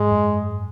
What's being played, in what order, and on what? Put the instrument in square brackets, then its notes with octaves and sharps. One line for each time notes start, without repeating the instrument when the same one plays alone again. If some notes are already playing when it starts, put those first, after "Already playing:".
Already playing: [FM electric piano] G#2 [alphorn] G#3
[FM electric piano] F#2